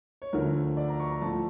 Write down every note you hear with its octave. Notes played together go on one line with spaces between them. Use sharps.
C#5
D2 D3 F3 A3 A#4
D5
A#5
C#6
A#5
A2 F3 A3 A5